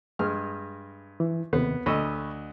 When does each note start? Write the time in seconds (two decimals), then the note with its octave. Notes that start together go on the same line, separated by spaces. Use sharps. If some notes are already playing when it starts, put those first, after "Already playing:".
0.19 G2 G#3 F6
1.20 E3
1.53 D#2 C3 D#3 B3
1.86 D2 D#5 B5 C#6 E6